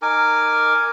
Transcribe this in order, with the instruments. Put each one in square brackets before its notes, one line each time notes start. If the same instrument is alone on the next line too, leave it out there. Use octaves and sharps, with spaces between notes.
[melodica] D#4 A#4 G#5 D6